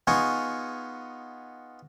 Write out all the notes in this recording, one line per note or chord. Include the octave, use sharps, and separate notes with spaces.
B3 D#4 F4 G#4 G#5 C#6